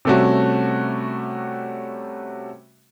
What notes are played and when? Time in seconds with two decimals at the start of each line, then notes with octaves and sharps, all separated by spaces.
0.05 C3 G3 A3 C#4 F#4